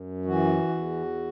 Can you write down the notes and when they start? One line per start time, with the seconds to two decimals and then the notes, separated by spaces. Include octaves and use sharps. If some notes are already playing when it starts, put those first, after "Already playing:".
Already playing: F#2
0.26 E3 F#4
0.68 E2